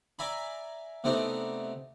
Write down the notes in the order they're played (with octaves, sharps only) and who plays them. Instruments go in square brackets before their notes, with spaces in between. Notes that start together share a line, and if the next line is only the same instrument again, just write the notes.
[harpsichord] D5 E5 G#5 A#5 B5
C3 A3 B3 C4 D4 D#4